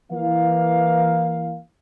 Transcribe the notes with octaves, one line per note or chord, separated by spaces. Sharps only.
E3 A#3 F5